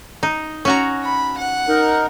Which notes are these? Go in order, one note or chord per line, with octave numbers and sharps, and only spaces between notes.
D#4
C#4 F#4 A#5
B5
F#5
D#4 A#4